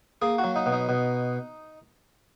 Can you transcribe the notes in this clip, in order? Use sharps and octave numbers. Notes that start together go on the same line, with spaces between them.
A#3 G#4
F#4
F#3
D#4
B2
D#4
B2